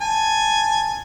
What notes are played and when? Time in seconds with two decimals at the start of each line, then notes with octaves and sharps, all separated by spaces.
0.01 G#5 A5